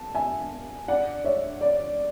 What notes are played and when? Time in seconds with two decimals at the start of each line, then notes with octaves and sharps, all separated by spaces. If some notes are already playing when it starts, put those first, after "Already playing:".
Already playing: A5
0.15 E5 G#5
0.88 D5 F#5
1.25 C#5 E5
1.61 D5